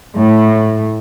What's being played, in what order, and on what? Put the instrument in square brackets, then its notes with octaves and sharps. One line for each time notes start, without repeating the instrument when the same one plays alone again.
[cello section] A2